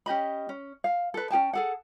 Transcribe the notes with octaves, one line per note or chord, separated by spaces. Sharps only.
C#4 G4 D#5 B5
C#4
F5
A4 B4
C#4 G#4 G5 A5
G#4 A4 F#5